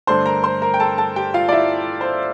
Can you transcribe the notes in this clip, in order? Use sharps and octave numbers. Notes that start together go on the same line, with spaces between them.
G2 D3 A3 D4 C5 C6
A#4 A#5
C5 C6
A#4 A#5
G5
A4 A5
A4 A5
G4 G5
F4 F5
D5
E4 E5
C5